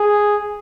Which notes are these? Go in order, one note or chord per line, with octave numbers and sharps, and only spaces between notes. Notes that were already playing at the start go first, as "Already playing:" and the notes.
Already playing: G#4